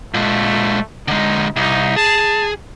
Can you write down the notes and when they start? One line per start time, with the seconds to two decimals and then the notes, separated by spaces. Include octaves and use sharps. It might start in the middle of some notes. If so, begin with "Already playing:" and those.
0.14 A#2 G#3 A3
1.08 D3 G#3 D#4
1.56 C2 D#4
1.96 G#4 A5